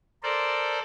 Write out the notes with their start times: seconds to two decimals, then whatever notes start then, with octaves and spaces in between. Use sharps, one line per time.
0.23 A4 A#4 C5 D5